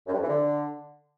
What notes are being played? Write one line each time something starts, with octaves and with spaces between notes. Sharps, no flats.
F#2
G2
F2
E3
D3